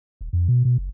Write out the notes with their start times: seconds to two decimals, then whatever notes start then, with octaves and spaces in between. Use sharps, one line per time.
0.21 D#1
0.33 F2
0.48 B2
0.65 B2
0.78 F#1